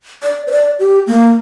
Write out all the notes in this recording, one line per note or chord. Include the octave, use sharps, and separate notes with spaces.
D5
C5
D5
G4
A#3